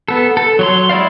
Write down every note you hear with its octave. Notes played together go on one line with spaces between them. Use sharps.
B3 A4
A4
F#3 C#5 C6
G#3 E4 D5 F5